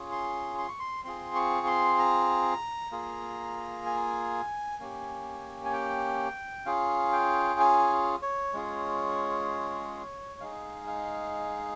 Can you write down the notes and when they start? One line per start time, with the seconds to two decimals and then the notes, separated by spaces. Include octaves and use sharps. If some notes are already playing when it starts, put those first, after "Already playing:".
Already playing: C#4 F4 G#4
0.12 C6
0.58 C6
0.69 C#6
0.79 C6
1.04 C4 F4 G#4 C6
1.35 C#6
1.67 C6
1.99 A#5
2.91 A#3 F4 G#4
3.86 G#5
4.79 A#3 C#4 G4
5.65 G#5
5.73 G5
6.66 C#4 F4 G#4 F5
7.12 G5
7.60 G#5
8.22 C#5
8.53 G#3 C#4 F4 G#4
10.40 G#3 D#4 G#4 F5
10.87 F5